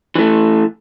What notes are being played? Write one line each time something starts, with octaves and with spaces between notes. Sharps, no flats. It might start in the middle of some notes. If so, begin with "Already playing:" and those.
E3 A3